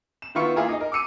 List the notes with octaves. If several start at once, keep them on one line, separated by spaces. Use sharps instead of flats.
E7
D#3 B3 E4 F4 C#6 C#7
A#3 E4 F4 G#4 A#4
D#4 D#5
A#4
D6 E6 C#7 D#7